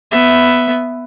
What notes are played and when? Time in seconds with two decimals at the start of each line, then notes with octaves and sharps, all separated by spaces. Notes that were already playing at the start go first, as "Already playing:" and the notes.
0.11 B3 E5